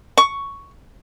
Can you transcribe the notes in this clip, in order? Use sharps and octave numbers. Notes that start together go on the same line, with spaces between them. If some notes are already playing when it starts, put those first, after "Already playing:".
C#6